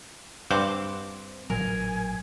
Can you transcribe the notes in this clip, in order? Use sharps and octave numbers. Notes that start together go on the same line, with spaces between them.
G2 C4 C5 F#5 D6
A1 A#2 F#3 A#4 G#5